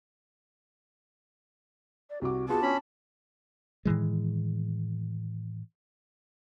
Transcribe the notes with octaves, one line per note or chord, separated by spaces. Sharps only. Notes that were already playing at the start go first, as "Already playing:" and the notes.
D5
C2 F#4 D6
B3 F4 F#4 G#4 A5
C#4 D4 B5
A2 D#3 E3 G#3